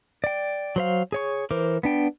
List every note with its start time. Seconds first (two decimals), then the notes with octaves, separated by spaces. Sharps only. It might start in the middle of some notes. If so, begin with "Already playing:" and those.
0.24 D5 G5
0.76 F#3 C5 F5
1.12 G#4 C#5 C#6
1.51 E3 A#4 C5 D6
1.83 B3 D4 G5